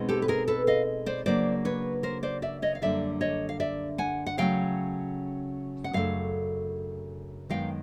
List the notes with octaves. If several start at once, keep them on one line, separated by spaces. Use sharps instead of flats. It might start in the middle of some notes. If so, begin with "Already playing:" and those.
Already playing: B2 G#3 C4 D#4
G4 A4
B4
G#4 A#4
A4 B4
D#5 F5
C5 D5
C#3 F#3 A#3 D4 C5 D5
B4 C#5
A#4 C5
C5 D5
D5 E5
C#5 D#5
F5
F#2 D3 G3 A#3 D4 D5 E5
C#5 D#5
F5
D5 E5
F#5 G#5
F#5
C#3 F#3 A3 C#4 F5 G5
F#5
F#2 C#3 A3 D4 F5
F#2 D#3 G#3 B3 F5 G5